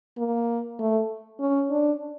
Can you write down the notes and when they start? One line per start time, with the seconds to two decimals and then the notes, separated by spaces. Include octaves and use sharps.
0.18 A#3
0.79 A3
1.40 C#4
1.70 D4